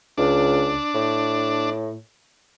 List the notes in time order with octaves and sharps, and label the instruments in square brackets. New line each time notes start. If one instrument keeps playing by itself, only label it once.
[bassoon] C#2 [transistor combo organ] D4
[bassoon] A2